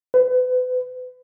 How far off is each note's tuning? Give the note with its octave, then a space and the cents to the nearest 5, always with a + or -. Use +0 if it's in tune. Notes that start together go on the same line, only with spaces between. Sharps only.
B4 +35